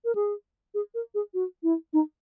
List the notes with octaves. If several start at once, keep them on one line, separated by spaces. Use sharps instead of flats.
A#4
G#4
G#4
A#4
G#4
F#4
E4
D#4